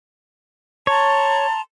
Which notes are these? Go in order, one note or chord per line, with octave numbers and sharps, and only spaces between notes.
C#5 A5 A#5 C6